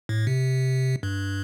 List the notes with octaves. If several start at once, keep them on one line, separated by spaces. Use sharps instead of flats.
A2
C3
G2